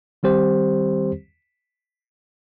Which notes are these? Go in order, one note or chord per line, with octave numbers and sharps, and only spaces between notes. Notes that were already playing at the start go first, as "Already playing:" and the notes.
D#3 G3 C4 G4 C5